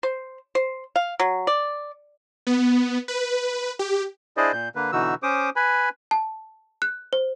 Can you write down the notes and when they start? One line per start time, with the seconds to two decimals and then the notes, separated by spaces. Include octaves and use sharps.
0.03 C5
0.55 C5
0.96 F5
1.20 F#3
1.47 D5
2.47 B3
3.08 B4
3.79 G4
4.37 D4 E4 G#4 C5 D5 D#5
4.53 A#2 G6
4.75 D3 A#3 B4
4.92 B2 D3 E3 D#4 F#4 E6
5.23 C#4 C5 D6 D#6
5.56 B4 G#5 B5
6.11 A5
6.82 F#6
7.13 C5